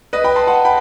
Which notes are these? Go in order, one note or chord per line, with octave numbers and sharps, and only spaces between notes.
B4 D#5
G5 B5
A5 C6
F#5 A5
G5 B5